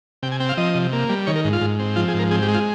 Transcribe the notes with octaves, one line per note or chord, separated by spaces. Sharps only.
C3 G5
G#5
C4 G5
F5
F3 D#5
C3
A#3
G3
D#3 C#5
A#4
G#2
F4
G#2
C4
F3 F4
G#4
G#2
A#4
C4 G#4
G4
G#3
F4